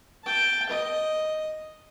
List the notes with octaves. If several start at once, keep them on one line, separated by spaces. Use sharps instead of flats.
G5 A5
D#5